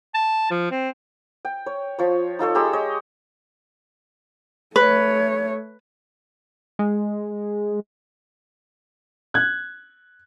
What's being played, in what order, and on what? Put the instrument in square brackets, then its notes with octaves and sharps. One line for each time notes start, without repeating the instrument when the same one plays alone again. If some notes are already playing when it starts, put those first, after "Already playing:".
[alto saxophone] A5
F3
C4
[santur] G5
C#5
F3 C#5
D#4 F4 A4 C#5
G#3 G4 A#5 E6
C#5 D#5
[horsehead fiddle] A3 C#5 [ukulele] B4
[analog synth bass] G#3
[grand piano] F#6 G#6